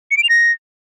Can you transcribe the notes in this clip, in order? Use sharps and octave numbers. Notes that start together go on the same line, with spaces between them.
C#7
D7
F7
A#6